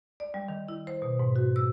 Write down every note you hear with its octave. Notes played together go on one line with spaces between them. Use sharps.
D5
G3
D#3
E4
C5
B2
G#2
F#4
E6